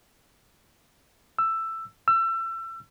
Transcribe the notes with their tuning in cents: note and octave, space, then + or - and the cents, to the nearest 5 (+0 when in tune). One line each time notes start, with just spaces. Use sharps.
E6 +10
E6 +30